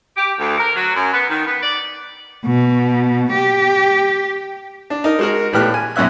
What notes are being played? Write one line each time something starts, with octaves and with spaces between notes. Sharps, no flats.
G4
D2
A#4
F#3
F#2
B3
D#3
B3
D5
B2
G4
D4
D#4 A#4
G#3 F#4 A#4
A#1 A2 B3 G4 F6 F#6
G#5
B1 F#2 C#4 E5 F#6